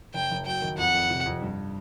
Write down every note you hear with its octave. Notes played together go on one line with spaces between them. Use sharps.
F#1 G5
F#1
F#3 G5
D#3
F2 F#5
F2
C3
F2
G2